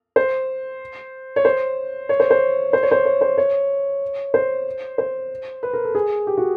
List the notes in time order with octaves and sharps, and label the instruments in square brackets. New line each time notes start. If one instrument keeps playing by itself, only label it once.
[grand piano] C5
C#5
C5
C#5
C5
C5
C5
C#5
C5
C#5
C5
C#5
C5
C5
B4
A#4
A4
G#4
G4
F#4